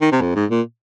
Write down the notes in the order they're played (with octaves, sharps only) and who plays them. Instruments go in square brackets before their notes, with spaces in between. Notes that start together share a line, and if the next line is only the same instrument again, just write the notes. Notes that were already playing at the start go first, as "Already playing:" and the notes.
[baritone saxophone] D#3
C3
F2
G#2
A#2